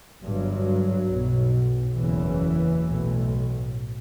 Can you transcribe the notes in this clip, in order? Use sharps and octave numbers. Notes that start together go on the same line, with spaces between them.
G1 G2 F#3
B1 B2
F#1 E2 C#3 E3
B1 A2